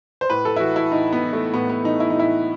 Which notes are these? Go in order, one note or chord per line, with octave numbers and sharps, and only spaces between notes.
C5
A2 B4
A4
E4
E3 F#4
E4
A2 D#4
B3
E3
A3
A2 B3
B3
E3 D#4
E4
D#4
A2 E4